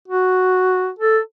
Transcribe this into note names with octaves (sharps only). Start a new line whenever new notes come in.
F#4
A4